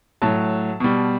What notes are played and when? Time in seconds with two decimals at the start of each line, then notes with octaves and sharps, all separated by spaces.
0.22 A2 F#3 A5
0.80 B2 G3